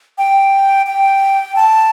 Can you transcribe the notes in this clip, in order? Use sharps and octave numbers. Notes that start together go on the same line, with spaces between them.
G5
G5
A5